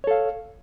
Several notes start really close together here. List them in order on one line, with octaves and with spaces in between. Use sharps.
C#5 A4 F5